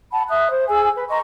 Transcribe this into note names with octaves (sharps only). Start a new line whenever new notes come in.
F#5 A5 B5
E5 D#6 F#6
C5
G#4 G#5 E6
B4
D#5 A#5 C6 C#6